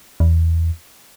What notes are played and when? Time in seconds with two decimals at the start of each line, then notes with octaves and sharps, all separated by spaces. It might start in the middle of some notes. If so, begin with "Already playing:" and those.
0.20 E2